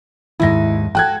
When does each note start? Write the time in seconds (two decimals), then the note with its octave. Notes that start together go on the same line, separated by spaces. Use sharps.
0.40 D#2 G#2 D#4 E4 A#6
0.95 F#4 G#4 A4 G5 F#6 G#6